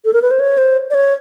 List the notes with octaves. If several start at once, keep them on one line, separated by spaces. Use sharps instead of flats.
A4
A#4
B4
C5
C#5
C5
D5
C#5